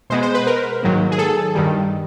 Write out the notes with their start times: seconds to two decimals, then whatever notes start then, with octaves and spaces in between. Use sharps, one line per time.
0.10 B2 G#3 B3 C5
0.22 C5
0.34 B4
0.47 A#4
0.83 G#2 D#3 F#3 A#3
1.12 G#4
1.18 A4
1.55 G2 D#3 G3